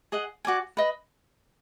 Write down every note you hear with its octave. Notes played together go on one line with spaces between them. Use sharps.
G#4 D#5 F#5
F#4 D5 G#5
B4 D#5